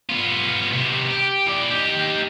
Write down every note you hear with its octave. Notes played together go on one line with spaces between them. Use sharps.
B3 F4
C3 B3
G4
E3 D5
D#4 G4